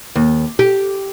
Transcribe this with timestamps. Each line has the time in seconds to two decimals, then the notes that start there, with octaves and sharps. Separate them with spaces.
0.16 D#2
0.59 G4